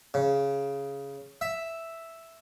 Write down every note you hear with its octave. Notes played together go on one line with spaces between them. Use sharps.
C#3
E5